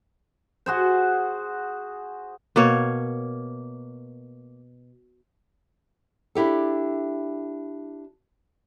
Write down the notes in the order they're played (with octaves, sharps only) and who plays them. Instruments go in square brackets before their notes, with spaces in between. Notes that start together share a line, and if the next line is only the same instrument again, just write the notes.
[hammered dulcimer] F#4 G#4 C5
[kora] B2 A#3 C#5
[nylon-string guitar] D4 E4 G4 A4